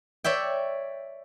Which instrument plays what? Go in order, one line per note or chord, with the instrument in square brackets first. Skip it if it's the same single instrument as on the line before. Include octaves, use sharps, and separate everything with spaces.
[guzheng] C#5 D5 E5 G5